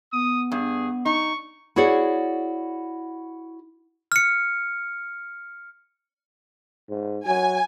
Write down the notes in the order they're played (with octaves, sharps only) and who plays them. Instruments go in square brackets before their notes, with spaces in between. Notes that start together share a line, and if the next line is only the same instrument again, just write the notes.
[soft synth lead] B3 [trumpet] D#6
[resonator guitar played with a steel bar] G2 [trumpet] G#4
[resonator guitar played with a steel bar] D#4 [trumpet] C#6
[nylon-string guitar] E4 F#4 G#4 C#5 D5 F#5
[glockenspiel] F6 C#7
[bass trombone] G#2
[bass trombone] F#3 [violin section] G#5